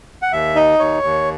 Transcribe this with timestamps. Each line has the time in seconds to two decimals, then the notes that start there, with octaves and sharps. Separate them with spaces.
0.22 F#5
0.32 D#2 E5
0.55 D#4 D#5
0.79 D#2 C#5
1.03 D#2